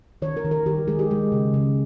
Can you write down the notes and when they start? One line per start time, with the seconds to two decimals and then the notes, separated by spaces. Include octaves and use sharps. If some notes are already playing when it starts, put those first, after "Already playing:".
0.22 D#3 C#5
0.37 A#4
0.45 D#3
0.51 A#4
0.66 D#3 G4
0.88 G#3 G#4
0.99 G4
1.11 G#3
1.32 C#3
1.54 C#3